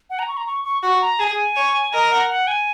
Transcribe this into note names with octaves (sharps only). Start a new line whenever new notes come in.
F#5
A#5
C#6
A#5
C#6
C#6
F#4 C#6
A#5
G#4 G#5
C#5
A#4 D#5
F#5
F#5
G#5